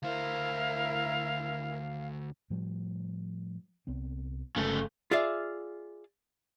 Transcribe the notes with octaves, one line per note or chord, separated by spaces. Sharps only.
D2 E4 A#4 C5 F5
A2 F3 G3
C2 B3 C4
G1 C#3 G#3 A3 C#4
F4 G#4 D5 E5 F5